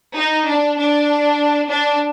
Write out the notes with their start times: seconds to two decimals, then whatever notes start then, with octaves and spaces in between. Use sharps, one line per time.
0.17 D#4
0.47 D4
0.78 D4
1.69 D4